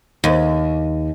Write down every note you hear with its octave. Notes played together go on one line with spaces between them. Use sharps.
D#2